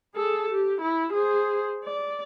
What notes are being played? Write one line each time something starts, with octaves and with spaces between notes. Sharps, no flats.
G#4 A4
G4
E4
G#4 C5
D5